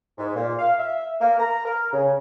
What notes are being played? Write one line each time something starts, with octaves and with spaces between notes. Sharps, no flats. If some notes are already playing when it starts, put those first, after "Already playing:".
G#2
A#2
F5
E5
A#3
A#5
A#4
C#3